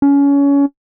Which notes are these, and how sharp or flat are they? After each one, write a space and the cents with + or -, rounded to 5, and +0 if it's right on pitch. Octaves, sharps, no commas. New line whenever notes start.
C#4 +25